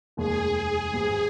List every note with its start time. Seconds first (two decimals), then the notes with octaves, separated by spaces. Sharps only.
0.17 F1 D#2 D#3 G#3 G#4
0.93 G#1 G2 G3